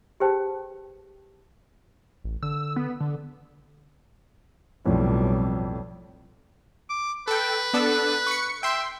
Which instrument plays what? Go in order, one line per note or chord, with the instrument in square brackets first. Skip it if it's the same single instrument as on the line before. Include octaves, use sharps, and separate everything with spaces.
[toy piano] G4 G#4 B4 C5 G5 A5
[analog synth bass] A1
[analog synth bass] D3 [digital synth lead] E6
[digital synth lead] B3
D3
[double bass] B1 G3 [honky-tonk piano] F2 A2
[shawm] D6
[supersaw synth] A4 G5 [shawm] B4
[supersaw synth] B3 D4 A4
C#6 C#7
[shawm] E5 [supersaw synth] G5 C6